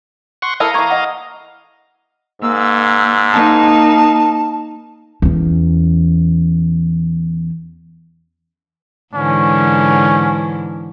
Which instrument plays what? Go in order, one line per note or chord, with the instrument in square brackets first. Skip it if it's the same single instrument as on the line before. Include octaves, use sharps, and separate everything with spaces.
[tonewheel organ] F#5 C6 C#6
[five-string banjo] E4 A4 A#4 [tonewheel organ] F5 A#5 D#6
[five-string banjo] E3 A#3 [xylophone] C#6 G#6
[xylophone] D#5 F#5
[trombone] G#2 [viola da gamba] A#3 [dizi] E6
[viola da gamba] A#3 D#4 [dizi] A5
[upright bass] E2 C#4
[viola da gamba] G#2 D3 E3 [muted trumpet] C#4